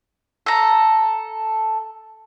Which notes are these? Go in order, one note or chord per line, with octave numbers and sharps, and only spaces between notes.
A4 A#5